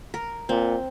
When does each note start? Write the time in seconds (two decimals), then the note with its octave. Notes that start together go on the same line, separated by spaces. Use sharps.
0.14 A#4
0.49 A#2 C4